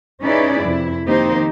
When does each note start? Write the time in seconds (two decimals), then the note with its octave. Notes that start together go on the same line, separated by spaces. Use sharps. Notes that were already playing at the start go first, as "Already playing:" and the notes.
0.22 C#4 D#4 E4 G#4 B4 D5
0.64 F2 C3 E4
1.06 D#3 A#3 C4 D#4 G4 C5